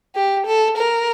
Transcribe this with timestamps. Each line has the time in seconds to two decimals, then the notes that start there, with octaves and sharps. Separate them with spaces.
0.15 G4
0.47 A4
0.78 A#4